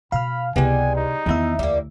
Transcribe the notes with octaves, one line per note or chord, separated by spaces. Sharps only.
B2 F5 B5 F6
C#2 C3 G3 G#3 B3 E4 G4 G#5
D#4
E2 D#3 B3 E4 E5
D2 G3 A#3